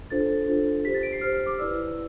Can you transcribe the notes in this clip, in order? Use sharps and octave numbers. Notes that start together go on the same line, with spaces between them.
D4 F4 A4 C5 A6
D4 F4 A4 C5
G4 C5 B6
A6
D7
C7
G4 C5 F6
F6
D6
E4 B4 D5 E6